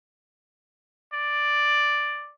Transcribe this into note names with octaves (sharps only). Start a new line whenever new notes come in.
D5